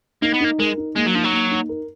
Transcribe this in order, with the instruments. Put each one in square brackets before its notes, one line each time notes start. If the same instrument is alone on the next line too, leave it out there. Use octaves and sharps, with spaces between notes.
[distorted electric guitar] A#3 [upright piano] D#4
[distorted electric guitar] B3
[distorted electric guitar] A#3 [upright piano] D#4
[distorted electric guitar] G#3 [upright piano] A#4
[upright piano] D#4
[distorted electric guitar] G#3 [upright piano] A#3
[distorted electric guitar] F#3
[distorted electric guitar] F3 [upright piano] D#4
[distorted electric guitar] F#3
[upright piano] A#3
D#4
A#4